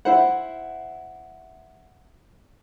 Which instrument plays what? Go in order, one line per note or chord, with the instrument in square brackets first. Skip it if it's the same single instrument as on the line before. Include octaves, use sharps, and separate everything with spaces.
[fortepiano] E4 C5 F#5